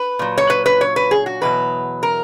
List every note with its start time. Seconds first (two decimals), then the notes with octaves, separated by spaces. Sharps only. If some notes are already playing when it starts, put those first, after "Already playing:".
Already playing: B4
0.19 A#2 F#3
0.38 C#5
0.50 B4
0.66 B4
0.81 C#5
0.96 B4
1.11 G#4
1.26 F#4
1.42 E2 B2 F#3 B4
2.03 A#4